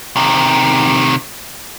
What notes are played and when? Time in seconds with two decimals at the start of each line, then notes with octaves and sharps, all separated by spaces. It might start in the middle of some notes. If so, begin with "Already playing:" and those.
0.16 C3 D#3